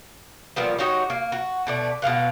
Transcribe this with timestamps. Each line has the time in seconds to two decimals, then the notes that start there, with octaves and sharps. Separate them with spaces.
0.56 A#2 F3 G3 B3
0.79 D#4 F#4 G4 C#5
1.10 A#3
1.32 F#4
1.67 B2 A3 D5
2.02 B2 G#3 F5 F#5